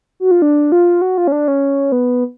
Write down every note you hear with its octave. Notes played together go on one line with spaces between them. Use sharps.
F#4
F4
D4
F4
F#4
F4
C#4
D4
C#4
B3